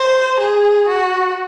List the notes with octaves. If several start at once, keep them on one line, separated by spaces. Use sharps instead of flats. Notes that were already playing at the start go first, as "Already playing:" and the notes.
Already playing: C5
G#4
F#4